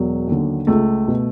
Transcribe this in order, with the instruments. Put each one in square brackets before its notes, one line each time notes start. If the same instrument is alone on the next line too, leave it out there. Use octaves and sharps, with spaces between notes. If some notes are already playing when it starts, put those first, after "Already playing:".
Already playing: [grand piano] E1 F#3
D#2 D3
C#2 A3
B2